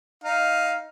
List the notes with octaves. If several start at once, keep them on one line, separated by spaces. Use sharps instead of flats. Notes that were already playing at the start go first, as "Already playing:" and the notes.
D#4 F5